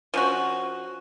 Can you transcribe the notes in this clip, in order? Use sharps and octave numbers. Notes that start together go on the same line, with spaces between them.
F3 C#4 F#4